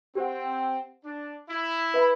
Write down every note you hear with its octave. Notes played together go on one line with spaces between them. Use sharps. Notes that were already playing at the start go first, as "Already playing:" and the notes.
C4 G4 C5 F#5
D4
E4
B4 E5 B5